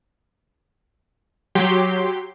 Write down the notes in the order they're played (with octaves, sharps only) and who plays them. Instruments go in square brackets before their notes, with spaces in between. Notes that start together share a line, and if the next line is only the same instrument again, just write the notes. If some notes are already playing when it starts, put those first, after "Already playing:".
[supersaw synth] F#3 G4 C6